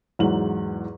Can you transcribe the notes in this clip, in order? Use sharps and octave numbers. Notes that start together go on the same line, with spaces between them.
E2 G#2 F#3 F#7